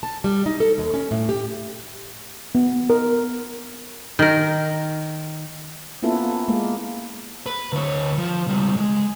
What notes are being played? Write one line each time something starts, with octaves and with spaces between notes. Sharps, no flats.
A5
G3
D#4
A4
D#2
C#4
A2
G4
B3
A#4
D#3 A#4
A#3 B3 C#4 E4 F4 A4
G#3 A#3
B4
D2 C#5
F3
C#2 G3
G#3